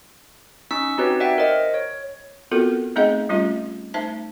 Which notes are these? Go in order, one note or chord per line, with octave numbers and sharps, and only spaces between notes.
C#4 D#4 C#6 E6 B6
C4 D#4 F#4 G4 B4 C#5
C#5 D5 E5 F#5 G5
A#4 C5 D#5
C#5
B3 C4 F4 F#4 A4 A#4
A3 C4 D#4 G#4 D#5 F#5
G3 A3 C#4 F4 G4
A3 D#4 C5 E5 A5